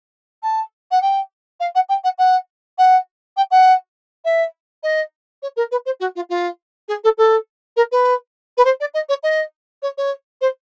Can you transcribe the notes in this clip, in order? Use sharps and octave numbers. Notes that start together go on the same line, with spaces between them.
A5
F#5
G5
F5
F#5
G5
F#5
F#5
F#5
G5
F#5
E5
D#5
C#5
A#4
B4
C5
F#4
F4
F4
G#4
A4
A4
A#4
B4
B4
C5
D5
D#5
C#5
D#5
C#5
C#5
C5